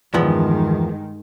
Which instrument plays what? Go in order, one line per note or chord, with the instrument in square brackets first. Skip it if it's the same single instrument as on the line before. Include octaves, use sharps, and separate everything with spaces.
[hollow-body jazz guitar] E2 F3 B3 [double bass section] G2 D#3 G#3